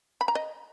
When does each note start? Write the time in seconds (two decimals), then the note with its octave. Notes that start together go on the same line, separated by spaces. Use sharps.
0.21 B5
0.28 A#5
0.35 D#5